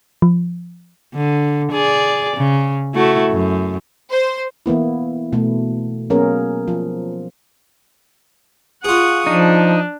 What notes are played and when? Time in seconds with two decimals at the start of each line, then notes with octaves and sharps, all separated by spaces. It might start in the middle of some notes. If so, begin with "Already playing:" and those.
0.22 F3
1.15 D3
1.72 G#4 D5
2.37 C#3
2.94 A3 E4 F#4
3.31 F#2
4.09 C5
4.66 E3 A#3 B3 E4
5.33 B2 A3
6.10 F#3 A#3 B3 C#4 G#4 A#4
6.68 F3
8.84 F4 G#4 F#5 C#6 D#6
9.27 F3 D4 D#4